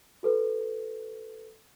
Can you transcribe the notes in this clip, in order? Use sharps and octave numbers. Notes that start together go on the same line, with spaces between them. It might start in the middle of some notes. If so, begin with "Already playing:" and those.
F#4 A4 B4